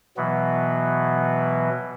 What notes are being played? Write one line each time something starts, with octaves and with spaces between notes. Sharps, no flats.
B2 E3 F#3 B3